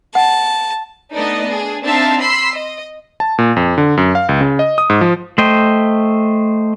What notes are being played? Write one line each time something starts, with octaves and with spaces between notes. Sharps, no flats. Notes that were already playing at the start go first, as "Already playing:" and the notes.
F#5 A5
A3 B3 D4 D#4 D5 D#5
D4 G#4
C4 D4 D#4 E5 F5 A5
B5 C6 E6 B6 C7
D#5
A5
A#2
F2
D3
F#2
F5
C#2
C#3
D#5
D#6
G#2
F3
A3 C5 D#5 G5